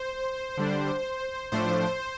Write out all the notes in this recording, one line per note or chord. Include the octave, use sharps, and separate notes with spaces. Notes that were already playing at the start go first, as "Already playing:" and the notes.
Already playing: C5
D3 G3 D4
A2 F3 A3 D4 C5